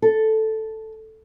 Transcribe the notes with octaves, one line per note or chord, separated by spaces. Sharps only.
A4